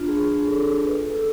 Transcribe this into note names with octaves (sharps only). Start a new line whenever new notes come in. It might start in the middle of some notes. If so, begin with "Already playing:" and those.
Already playing: D4 F4
G#4
G#4
A4
B4
A4